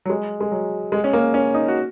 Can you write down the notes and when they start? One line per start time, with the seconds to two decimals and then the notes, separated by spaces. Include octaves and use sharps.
0.05 F#3
0.10 G#3
0.41 G#3
0.52 F#3
0.92 G#3
1.04 C#4
1.13 A#3
1.34 C#4
1.54 D#4
1.68 F#4